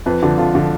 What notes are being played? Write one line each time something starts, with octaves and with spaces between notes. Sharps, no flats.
F2 B4
D3 F3
F2 F4
D3 F3